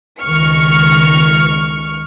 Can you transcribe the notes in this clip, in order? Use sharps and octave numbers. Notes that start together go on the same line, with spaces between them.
C#2 D#3 C#6 F6 C#7